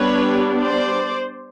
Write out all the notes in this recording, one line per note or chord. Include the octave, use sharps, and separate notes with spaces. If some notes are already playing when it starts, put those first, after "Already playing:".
Already playing: G3 B3 D4 B4 C#5
C5 D5